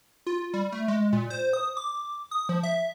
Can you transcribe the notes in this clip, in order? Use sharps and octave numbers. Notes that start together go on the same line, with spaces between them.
F4
G3
A3
G#3
A#2
C5
D#6
D6
D#6
F3
E5